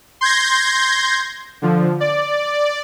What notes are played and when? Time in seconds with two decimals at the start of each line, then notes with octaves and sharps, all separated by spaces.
0.21 C6 G6 G#6 A#6
1.62 D3 F3
2.00 D5